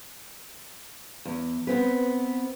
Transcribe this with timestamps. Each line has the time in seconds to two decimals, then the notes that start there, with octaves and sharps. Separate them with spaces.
1.25 E2
1.67 B3 C4 B4